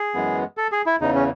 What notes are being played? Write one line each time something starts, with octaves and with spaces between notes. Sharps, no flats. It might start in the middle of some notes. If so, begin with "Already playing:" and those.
Already playing: G#4
F#2 E3 G#3 B3
A4
G#4
E4
E2 C#3 E3 D#4
C#4